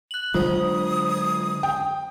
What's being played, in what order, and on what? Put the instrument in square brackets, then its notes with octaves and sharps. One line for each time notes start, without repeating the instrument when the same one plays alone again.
[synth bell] F#6 F#7
[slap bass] D3 F#3 G#3 [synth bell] F4 C5 [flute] D#6
[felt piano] G5